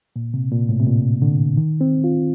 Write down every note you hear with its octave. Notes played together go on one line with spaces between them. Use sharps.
A#2
C3
A#2
A2
C3
A#2
D3
D#3
C4
F4